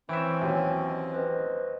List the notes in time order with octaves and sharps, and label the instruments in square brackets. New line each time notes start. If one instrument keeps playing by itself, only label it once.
[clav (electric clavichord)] E3 E5 [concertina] C4 C#4 [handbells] C#6 G6 D7
[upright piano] D#2 F#3 [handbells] G5 G#5
[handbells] D#5
B4 C5 D#5